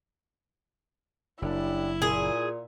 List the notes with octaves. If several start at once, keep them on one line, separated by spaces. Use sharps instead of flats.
F#1 F#2 G3 D4 E4
A#2 G#4